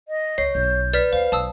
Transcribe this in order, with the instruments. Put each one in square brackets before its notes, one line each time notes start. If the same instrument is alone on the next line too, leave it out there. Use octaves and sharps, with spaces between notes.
[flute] D#5
[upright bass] C#2 [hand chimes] C#5 [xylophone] C7
[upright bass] B1 [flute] G6
[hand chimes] B4 [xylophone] D5 F6 B6
[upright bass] D#2 [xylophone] C5 [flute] F5
[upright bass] B1 [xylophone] A5 D#6 E6